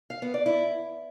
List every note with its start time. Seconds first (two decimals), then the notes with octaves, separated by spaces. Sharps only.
0.10 F5
0.22 B3
0.34 D5
0.46 E4